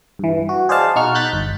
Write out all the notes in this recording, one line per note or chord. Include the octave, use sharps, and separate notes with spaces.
G2 E3
F#4
G#4 C5 D5 D#5 F5 A5
B2 D#4 F#5 C#6 F6
F#6 G6 A6 B6
G1